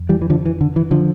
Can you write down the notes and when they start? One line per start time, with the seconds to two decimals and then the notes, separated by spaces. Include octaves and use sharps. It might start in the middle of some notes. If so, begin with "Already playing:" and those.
Already playing: F2
0.09 E3 G3
0.22 E3
0.30 D3 F3
0.46 E3
0.61 D3
0.76 E3
0.91 D3 F3